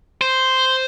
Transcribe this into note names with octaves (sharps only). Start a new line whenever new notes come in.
C5